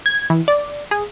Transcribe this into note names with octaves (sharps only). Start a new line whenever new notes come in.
G#6
E3
D5
G#4